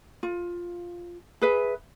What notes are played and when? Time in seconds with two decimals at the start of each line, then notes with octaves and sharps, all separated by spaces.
0.23 F4
1.42 G#4 B4 E5